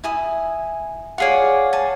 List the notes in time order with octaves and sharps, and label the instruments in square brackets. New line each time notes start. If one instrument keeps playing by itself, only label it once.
[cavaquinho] E4 G#5 D#6
[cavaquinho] F4 G#4 D5 [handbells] C#5 F5 F#5
[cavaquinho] G#5 A5